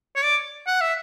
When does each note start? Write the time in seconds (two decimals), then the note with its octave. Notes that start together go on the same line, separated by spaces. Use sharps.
0.16 C#5
0.23 D5
0.67 F#5
0.81 E5